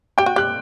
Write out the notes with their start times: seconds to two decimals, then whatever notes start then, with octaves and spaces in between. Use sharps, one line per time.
0.18 G4 G5
0.26 F#4
0.36 G4 F#6